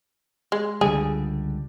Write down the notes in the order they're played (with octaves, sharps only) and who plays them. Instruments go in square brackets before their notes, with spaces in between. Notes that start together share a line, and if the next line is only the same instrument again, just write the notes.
[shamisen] G#3
[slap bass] C#2 D3 G3 [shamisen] G#4